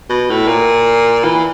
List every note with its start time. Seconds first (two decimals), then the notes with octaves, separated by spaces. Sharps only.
0.10 B2
0.30 A2
0.48 A#2
1.25 E3